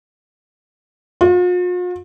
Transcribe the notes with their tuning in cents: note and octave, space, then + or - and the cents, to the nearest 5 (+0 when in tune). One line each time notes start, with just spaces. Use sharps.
F4 +45